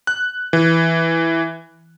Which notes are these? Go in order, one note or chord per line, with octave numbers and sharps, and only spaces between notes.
F#6
E3